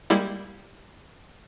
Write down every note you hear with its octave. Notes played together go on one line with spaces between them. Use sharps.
G3 G#3 A#3 E4